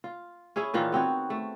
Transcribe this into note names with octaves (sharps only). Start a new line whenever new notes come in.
F4
C#4 E4 G#4 C#5
A#2 D#3 E3 F4
B3 C4 F#4 C#5
A3